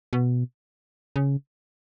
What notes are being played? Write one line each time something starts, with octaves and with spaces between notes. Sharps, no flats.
B2
C#3